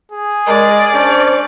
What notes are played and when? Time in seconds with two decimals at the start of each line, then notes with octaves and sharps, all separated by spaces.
0.12 G#4
0.47 G#3 A#4 D5
0.93 C#4 D4 C5